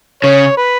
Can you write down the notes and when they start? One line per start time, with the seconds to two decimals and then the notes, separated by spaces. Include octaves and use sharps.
0.23 C#3 C#5
0.57 B4